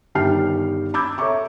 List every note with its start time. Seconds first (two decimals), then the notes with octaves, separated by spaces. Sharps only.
0.15 G1 D#3 G3 G5 F6 C7
0.94 B5 D6 E6 G6 G#6
1.18 A4 C#5 E5 A#5 C#6 D6